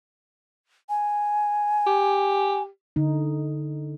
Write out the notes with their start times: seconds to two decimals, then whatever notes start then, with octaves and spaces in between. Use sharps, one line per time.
0.89 G#5
1.87 G4
2.96 D3 D#4